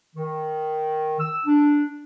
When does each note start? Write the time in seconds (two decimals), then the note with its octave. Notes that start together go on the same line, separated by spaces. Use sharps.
0.16 D#3
1.19 E6
1.46 D4